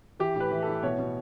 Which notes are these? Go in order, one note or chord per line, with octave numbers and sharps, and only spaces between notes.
E3 G4
A2
B4
E3
A4
A2
B2 C#5
B2